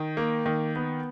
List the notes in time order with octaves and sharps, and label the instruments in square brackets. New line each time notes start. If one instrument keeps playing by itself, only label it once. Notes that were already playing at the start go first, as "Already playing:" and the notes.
Already playing: [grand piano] D#3
A#3
D#3
B3